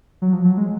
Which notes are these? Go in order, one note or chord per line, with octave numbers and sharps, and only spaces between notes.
F#3
F3
F#3
G#3